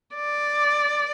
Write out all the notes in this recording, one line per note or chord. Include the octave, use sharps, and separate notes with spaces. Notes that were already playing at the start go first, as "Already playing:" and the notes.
D5